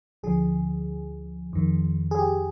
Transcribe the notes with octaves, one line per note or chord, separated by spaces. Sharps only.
D2 D3 F3 G#4
F2 D#3
G#4
G4